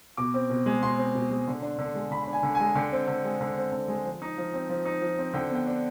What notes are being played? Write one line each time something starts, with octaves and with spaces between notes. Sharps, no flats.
B2 D6
C4
B2
G#3
B2 C6
C4
B2
G#3
D3
D4
D3
G#3
D3 B5
D4 B5
G#5
D3
G#5
G#3
D3 G5
C4
D3
G#3
D3
C4
D3
G#3
F3
D#4
F3
C4
F3
D#4
F3
C4
D3 G5
B3
G5
D4